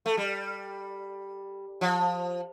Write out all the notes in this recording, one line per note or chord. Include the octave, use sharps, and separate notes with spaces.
A3
G3
F3